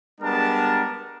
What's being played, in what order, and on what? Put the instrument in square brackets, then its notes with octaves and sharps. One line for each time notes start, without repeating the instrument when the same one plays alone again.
[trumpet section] G3 G#3 B3 D4 A#4 A5